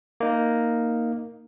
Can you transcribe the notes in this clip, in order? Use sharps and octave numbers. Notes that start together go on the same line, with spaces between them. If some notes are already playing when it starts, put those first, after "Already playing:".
A#3 D#4